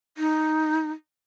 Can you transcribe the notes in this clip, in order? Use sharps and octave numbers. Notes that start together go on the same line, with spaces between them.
D#4